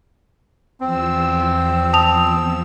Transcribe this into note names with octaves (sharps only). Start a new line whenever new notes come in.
E2 F3 C4 E6
A5 D#6 F7